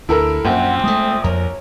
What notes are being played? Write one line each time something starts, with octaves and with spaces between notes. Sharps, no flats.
D2 E4 A4 A#4
A#1 F#2 C4 F#5
G#3 A3 D#6
F2 A#4 C#5